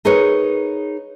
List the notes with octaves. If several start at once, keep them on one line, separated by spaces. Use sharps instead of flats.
D#4 G#4 A#4 B4 C#5